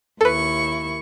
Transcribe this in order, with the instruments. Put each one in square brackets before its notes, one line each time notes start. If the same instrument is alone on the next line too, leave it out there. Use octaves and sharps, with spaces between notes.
[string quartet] D#2 E4 C#6 [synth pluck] A4 B4